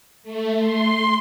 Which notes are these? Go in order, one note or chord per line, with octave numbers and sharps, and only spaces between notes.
A3
C6